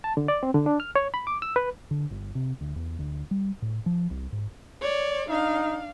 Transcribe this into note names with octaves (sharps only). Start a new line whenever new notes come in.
A5
D3
D5
C4
D3
D4
F6
C#5
B5
D6
E6
B4
D3
G1
C3
D2
E2
D2
G3
A2
F3
C2
G#2
C#5 D5
D4 D#4 F5